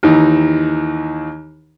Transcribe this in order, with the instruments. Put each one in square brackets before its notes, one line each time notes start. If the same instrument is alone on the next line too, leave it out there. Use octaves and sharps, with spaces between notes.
[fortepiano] D#2 E3 D#4